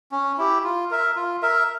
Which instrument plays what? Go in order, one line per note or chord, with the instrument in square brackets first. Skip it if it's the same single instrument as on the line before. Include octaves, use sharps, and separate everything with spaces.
[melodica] C#4
E4 G4
F4
A#4 E5
F4
A#4 E5